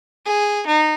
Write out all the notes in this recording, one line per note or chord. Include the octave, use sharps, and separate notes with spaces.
G#4
D#4